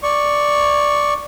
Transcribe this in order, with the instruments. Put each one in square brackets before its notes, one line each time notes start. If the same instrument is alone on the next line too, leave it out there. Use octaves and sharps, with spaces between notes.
[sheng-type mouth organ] D5 C#6